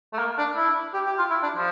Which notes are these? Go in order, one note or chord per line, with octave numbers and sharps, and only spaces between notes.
A3
A#3
D4
E4
G4
G4
F4
E4
D4
F3